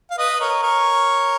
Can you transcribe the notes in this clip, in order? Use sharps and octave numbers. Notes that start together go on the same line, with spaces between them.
F5
B4 D#5
A#4 C#5
A#4 C#5